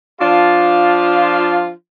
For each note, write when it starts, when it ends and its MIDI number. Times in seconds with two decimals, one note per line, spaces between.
0.20 1.70 53
0.20 1.70 62
0.20 1.70 65